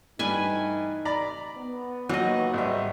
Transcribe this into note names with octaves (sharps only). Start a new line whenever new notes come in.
G2 E3 A3 D#4 B4 G#5
D5 A#5 B5
B3
D#2 F#3 D#5
G#1 G3 E5